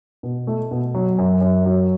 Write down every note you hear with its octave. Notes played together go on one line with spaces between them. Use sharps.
B2
A3
B2
F#3
F#2
F#2
F#3